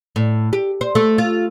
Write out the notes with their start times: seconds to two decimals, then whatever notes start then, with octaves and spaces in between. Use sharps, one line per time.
0.16 A2
0.53 G4
0.81 C5
0.95 A3
1.18 F4